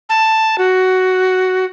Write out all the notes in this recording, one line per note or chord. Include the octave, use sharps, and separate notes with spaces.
A5
F#4